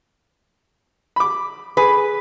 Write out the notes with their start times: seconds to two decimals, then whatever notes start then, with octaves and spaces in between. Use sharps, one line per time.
1.16 B5 D6
1.77 G#4 B4